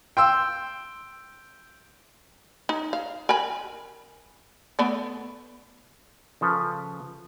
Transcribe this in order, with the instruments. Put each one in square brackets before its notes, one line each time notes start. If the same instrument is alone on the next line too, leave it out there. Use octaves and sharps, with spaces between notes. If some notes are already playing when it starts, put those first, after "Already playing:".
[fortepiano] G5 C6 E6
[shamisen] D#4
F5
A#4 G#5 B5
A3 B3 D5
[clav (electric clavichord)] C#3 F3 A4 B4